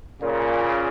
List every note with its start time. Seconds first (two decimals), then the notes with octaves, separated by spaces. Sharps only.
0.21 A#2 C#3